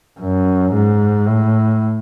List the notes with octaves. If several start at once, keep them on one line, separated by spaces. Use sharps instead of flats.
F#2
G#2
A2